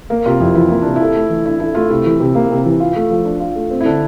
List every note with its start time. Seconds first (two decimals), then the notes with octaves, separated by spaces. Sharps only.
0.10 A#3 A#4
0.26 C3 F4
0.40 F2 E4
0.55 E3 F4
0.69 A#3 E4
0.82 C3 D4
0.96 E4 A4
1.16 A3
1.30 E3
1.45 D4 E4
1.60 E4 A4
1.75 A3 F4
1.90 C3 E4
2.06 E3
2.20 C3
2.35 A#3
2.51 C3
2.66 E3
2.80 F4
2.96 A3
3.11 F3
3.25 D4
3.40 F4
3.56 A3
3.70 C4
3.81 E4
3.85 D3 D4